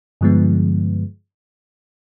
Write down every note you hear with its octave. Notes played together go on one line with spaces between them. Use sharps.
G2 D3 F3 G#3 B3